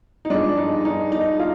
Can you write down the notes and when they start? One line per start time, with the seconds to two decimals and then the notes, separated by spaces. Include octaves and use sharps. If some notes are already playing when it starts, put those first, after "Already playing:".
0.25 D#4
0.30 G2 F3 G#3 D4
0.57 D#4
0.85 D#4
1.12 D#4
1.39 F4